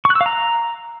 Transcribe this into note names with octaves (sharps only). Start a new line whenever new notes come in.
C#6
F#6
E6
F5
A#5